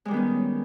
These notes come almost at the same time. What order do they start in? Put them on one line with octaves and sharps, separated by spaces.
G#3 G3 D#3 B3 C#4